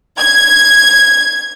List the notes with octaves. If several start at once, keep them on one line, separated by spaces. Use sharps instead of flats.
G#6